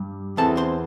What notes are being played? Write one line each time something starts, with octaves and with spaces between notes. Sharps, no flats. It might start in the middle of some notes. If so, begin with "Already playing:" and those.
Already playing: G2 G3
E2 E3 C4 A4 A5
C5 C6